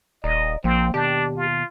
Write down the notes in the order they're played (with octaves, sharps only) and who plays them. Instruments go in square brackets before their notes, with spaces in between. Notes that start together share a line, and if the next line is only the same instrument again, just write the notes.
[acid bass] D#1 [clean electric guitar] D5 A#5 [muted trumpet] D#5
[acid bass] A#1 [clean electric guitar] F3 A#3 [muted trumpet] C4
[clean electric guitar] D#2 B2 A5 [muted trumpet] D4 [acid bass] G4
[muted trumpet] F4